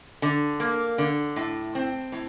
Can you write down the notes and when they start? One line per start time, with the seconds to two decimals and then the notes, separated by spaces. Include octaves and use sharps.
0.22 D3
0.60 A#3
0.98 D3
1.36 A2
1.75 C4
2.12 A2